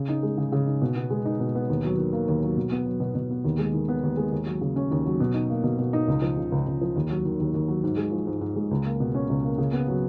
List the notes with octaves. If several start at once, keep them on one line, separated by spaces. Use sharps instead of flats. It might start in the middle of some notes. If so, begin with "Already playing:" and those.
Already playing: C#3
D#4
G#3
C#3
C#3
D#4
B2
B3
G#3
D#4
B2
B3
D#2
F#3
D#3
A#3
D#2
F#3
B2
B3
F#3
B2
B2
B3
D#2
G#3
D#3
B3
D#2
G#3
D#2
F#3
C#3
C#4
D#2
F#3
B2
D#4
A#3
B2
B2
D#4
C#2
F3
C#3
C#2
C#2
F3
D#2
F#3
D#3
D#2
D#2
F#3
G#2
G#3
F3
G#2
G#2
G#3
C#2
A#3
B2
C#4
C#2
A#3
C#3
B3
F#3